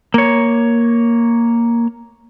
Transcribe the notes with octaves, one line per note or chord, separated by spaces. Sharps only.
A#3 C#5